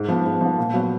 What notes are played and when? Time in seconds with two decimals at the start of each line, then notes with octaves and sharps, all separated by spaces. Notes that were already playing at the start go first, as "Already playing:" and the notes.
Already playing: G#2
0.08 F3 B3
0.25 G#2
0.41 F3 B3
0.58 A#2
0.74 F#3 B3